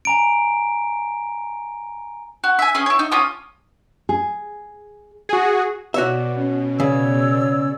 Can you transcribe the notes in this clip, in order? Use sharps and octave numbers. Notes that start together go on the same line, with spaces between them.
G#5 A#5 D7
F#4
E5 G#5
C#4 G#4 D#6
E4 C#5
D#4
C#4 F4 D6 D#6
G#4
F#4 G#4
B2 F#4 C#5 D5 E5
C#4
C#3 C#5 D5 E6